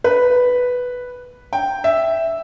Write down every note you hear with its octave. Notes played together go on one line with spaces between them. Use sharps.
B4
G5
E5